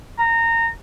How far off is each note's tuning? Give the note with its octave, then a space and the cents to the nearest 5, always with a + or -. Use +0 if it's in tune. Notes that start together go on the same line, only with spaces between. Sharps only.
A#5 -20